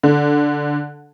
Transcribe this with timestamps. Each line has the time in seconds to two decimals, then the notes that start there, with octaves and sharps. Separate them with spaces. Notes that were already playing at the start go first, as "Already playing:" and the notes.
0.03 D3